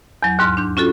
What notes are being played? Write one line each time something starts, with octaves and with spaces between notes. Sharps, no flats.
E2 F#3
D#2 G#2 C6 F6
D4 G6
C#4 F4 F#4 A4